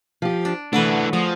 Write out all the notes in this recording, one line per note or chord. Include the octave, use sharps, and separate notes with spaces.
F3 G4
D4
D3 E3 A3 D4 F#4 B4
F3 G#4 D#5